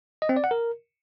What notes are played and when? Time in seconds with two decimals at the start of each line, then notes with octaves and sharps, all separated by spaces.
0.22 D#5
0.29 C4
0.36 D5
0.44 F#5
0.51 A#4